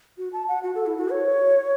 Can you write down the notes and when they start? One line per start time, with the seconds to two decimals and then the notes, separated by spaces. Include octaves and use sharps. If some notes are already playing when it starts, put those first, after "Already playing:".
0.18 F#4
0.33 A5
0.48 F#5
0.63 F#4
0.75 A4
0.86 E4
0.98 F#4
1.09 C#5